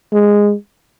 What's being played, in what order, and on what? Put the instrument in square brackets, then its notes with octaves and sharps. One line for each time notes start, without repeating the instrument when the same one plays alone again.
[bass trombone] G#3